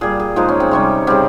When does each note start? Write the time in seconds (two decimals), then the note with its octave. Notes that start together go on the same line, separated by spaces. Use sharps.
0.01 A#2 G3 G#4
0.20 G#4
0.36 A#2 F3 G#3 D#4
0.48 C#4
0.60 C4
0.71 C3 G3 C#4
1.07 C#3 G3 C4